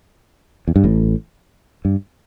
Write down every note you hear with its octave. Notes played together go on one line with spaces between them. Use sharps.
E2
G2
A1 A2
G2